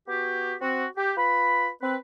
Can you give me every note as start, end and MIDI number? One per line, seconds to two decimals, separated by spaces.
0.08 0.55 59
0.08 0.55 66
0.08 0.55 67
0.62 0.86 60
0.62 0.86 66
0.97 1.12 67
1.18 1.69 65
1.18 1.69 71
1.18 1.69 83
1.83 1.97 60
1.83 1.97 71